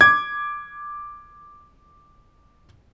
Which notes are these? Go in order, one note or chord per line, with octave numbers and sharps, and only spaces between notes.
D6 G#6